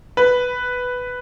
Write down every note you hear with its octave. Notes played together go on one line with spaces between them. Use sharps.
B4